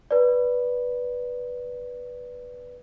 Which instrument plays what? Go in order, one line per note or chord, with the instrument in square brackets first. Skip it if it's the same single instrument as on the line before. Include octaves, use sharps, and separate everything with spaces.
[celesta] B4 D5